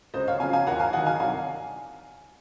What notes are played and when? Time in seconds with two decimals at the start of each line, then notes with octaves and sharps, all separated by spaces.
0.14 C#2 C5 D#5
0.28 C#5 F5
0.40 C#3 F3 F5 G#5
0.53 F5 G#5
0.67 D#2 F#5 A#5
0.79 F5 G#5
0.93 D#3 F#3 D#5 F#5
1.06 F5 G#5
1.20 C2 F5 G#5